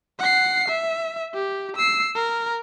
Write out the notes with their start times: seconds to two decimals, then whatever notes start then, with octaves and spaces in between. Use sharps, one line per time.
0.19 F#5 C7
0.68 E5
1.34 G4
1.76 E6 C7
2.16 A#4